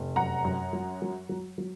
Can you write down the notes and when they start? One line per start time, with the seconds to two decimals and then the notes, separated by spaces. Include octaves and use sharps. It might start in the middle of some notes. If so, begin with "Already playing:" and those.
Already playing: F1
0.16 F#2 F#5 A#5
0.45 F#2
0.73 F#3
1.02 F#3
1.29 F#3
1.58 F#3